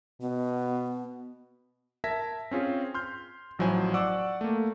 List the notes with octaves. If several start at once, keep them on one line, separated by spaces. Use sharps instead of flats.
B2 B3
A#4 E5 A5 G#6 A#6 B6
C4 C#4 F4 G#4
C6 F6 G6
A1 F3 F#3 E4 C5 G#5
D5 F#5 C#6 D6 E6
A3 A#3